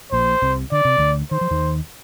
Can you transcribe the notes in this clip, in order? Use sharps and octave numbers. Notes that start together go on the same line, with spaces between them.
A#1 A#2 C5
C2 C3
D3 D5
C3
D2 D3
D#3 C5
F3
D#2 D#3